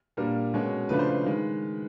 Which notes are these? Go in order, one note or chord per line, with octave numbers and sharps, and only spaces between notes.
A#2 G3 A#3 D4 A#4
B2 G#3 C#4
C#3 F3 A3 D4 B4
C5
B4
D#3 G#3